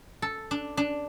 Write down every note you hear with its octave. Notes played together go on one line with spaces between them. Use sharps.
A4
D4
D4